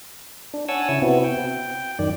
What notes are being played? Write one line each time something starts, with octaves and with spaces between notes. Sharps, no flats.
D4
C#5 F#5 G#5 A5 E6
C#3 E4
C3 B3 C4 E4 F#4
G5
F#2 D#3 D5